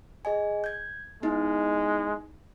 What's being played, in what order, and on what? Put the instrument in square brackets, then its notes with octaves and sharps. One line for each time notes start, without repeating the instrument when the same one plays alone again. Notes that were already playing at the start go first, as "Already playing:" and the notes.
[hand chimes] G#4 D#5 G#5
G6 G#6
[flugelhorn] G#3 [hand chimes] B3 D#4 E4